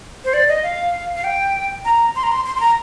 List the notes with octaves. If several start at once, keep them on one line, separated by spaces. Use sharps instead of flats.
C5
D5
D#5
F5
F5
G5
A#5
C6
A#5
C6
C6
C6
A#5